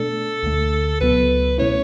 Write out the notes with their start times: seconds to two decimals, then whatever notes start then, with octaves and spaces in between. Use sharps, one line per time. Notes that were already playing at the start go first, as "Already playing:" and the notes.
Already playing: B2 A3 D4 A4
0.43 D2 D3 A3
1.01 C#2 B2 F#3 B3 B4
1.58 B2 A3 C#4 E4 C#5